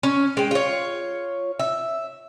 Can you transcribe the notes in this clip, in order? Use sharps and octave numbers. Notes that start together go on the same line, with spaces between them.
C#4
G#3 G5
F4 C#5
E5